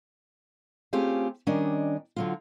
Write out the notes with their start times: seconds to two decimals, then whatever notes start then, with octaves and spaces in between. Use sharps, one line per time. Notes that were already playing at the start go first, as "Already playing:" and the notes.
0.93 A3 C4 C#4 F4 G4 G#4
1.47 D#3 G3 C#4 D4 D#5
2.16 D3 F#3 F4